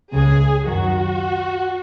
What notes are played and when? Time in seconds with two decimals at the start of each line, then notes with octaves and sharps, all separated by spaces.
0.13 C#2 C#3 G#3 G#4
0.66 F#2 D#3 F#3 F#4